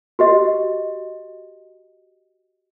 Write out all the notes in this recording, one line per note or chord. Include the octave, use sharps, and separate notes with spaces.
F#4 G4 D#5